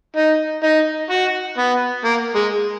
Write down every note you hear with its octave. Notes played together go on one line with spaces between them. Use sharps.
D#4
D#4
F#4
B3
A#3
G#3